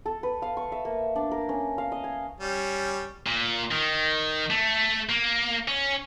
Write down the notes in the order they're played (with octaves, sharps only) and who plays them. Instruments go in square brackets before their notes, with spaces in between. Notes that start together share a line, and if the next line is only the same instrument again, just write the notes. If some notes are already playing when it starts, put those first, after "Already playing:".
[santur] A4
B4
F5
C#6
E5
A#3
D4
A#4
C#4
F5
D#5
G#5
[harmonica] G3 C#4
[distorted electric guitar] A#2
D#3
A3
A#3
C#4